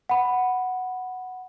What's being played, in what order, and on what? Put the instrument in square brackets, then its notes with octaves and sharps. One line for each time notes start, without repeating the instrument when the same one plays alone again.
[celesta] F#5 B5